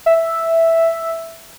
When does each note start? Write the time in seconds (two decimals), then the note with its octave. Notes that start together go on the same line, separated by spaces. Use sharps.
0.06 E5